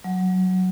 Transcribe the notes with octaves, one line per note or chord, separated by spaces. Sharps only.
F#3